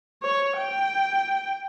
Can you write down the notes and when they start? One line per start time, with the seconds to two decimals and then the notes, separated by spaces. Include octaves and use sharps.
0.23 C#5
0.57 G5